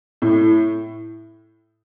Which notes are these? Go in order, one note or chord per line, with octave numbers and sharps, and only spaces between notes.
A2